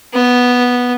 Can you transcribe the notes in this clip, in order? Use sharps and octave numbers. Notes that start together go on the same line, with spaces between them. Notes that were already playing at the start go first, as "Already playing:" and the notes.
B3